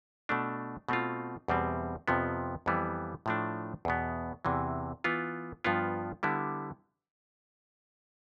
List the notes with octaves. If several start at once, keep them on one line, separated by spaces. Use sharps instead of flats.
B2 A3 D4
B2 A3 C4 F4
E2 B2 G3 C4
F2 C3 F3 B3
F2 E3 G3 B3
A2 F3 A3 D4
E2 B2 B3
E2 C3 E3
E3 B3 F4
G2 F3 B3 F4
D3 G3 B3 E4